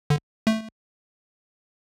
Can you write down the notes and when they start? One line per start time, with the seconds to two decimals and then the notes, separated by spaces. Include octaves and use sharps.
0.10 D3
0.47 A3